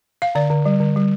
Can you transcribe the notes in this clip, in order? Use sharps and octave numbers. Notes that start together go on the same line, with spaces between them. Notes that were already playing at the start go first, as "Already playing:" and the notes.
F5
D3 D5
D3
G3
D3
G3